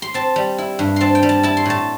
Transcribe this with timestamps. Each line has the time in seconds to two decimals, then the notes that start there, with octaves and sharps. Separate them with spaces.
0.02 C6
0.14 C4 A5
0.36 G3
0.58 E4
0.79 G2
0.96 C4 A5 C6
1.15 G5
1.23 G3
1.29 A5
1.43 E4 A5
1.57 C6
1.66 A2 A5